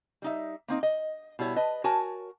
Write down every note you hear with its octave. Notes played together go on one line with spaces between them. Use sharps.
G3 D#4 E5
A#3 C4 D#4
D#5
B2 G3 E4 C#5
B4 D#5 A5
F#4 A#4 C#5 G#5 A5